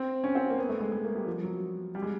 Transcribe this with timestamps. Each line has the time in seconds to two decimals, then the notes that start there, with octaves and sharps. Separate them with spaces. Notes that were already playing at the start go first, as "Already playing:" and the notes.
Already playing: C4
0.24 C#4
0.35 C4
0.50 A#3
0.58 B3
0.69 A3
0.80 G#3
0.92 G#3
1.04 A#3
1.16 G3
1.26 F3
1.43 F#3
1.95 G3
2.02 G#3